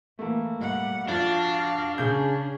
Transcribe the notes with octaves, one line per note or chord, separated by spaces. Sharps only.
E3 A3 A#3
G3 F#5
F2 D4 F#4 F5
C#3 C#4 G#4 G6